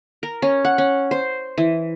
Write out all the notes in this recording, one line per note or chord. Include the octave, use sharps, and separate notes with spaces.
A#4
C#4
F#5
C#4
C5
E3